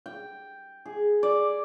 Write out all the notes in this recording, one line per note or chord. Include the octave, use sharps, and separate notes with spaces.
G5
G#4
D5